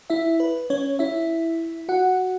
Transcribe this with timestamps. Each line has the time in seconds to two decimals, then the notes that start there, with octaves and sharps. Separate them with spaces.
0.10 E4 E5
0.40 B4
0.70 C#4 C#5
0.99 E4 E5
1.89 F#4 F#5